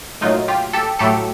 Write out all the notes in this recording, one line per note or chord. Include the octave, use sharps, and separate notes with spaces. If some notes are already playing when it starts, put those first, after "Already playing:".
A#2 F#3 A3 D#4 F4
F4 G4
G4 A4
A2 F#3 A3 G4 A4